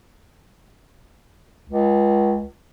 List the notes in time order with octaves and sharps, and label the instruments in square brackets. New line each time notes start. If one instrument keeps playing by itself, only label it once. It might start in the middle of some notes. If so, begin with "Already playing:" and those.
[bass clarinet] C#2